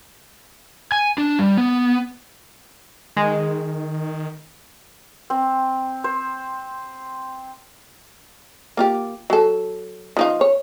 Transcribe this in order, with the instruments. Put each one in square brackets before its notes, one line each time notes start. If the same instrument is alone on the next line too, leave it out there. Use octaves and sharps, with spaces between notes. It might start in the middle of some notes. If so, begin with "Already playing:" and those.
[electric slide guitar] G#5
D4
G3
B3
[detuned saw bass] D#3 [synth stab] G#3
[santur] C4
C5
[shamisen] A#3 F4 G4
F#3 A4
F3 D#4 F4
C#5